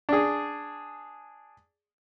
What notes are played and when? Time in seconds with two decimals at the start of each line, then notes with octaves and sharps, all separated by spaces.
0.09 D4 G#4